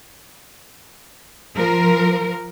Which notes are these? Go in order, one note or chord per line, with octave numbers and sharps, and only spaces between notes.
F3 A#4